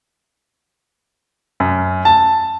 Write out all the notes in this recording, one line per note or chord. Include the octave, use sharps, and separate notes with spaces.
F#2
A5